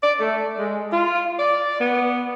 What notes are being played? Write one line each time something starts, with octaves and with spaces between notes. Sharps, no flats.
D5
A3
G#3
F4
D5
B3